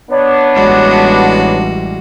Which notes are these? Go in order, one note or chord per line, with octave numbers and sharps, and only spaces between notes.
B3 D4 C#5
A1 G3 G#3 F#4